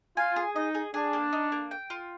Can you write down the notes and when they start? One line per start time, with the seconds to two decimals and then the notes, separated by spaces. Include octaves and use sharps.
0.16 F4 G#5
0.36 G#4
0.55 D#4 D#5
0.75 G#4
0.94 D4 G#4
1.13 A#3
1.33 D#4
1.52 A#3
1.71 G5
1.90 F4